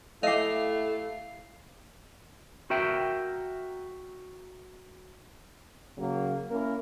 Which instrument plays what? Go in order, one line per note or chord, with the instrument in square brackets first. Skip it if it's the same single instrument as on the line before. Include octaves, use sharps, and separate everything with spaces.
[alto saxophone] A3 [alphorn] E4 [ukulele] G4 D#5 [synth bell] F5 C7
[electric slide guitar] F#4 A#4 E5 G5
[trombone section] C#3 F#3 A#3
A#3 C#4 E4 A#4